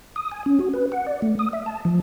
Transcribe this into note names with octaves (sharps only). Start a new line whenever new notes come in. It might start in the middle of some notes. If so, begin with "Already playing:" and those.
D#6
G#5
C#4
F#4
B4
F#5
D5
A3
D#6
E5
A5
F3